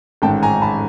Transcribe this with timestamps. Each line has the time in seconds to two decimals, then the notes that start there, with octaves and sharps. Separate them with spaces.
0.22 A1 G#2 D#3 G#3 C#4 G5 A5
0.43 G#5 A#5
0.62 A5 B5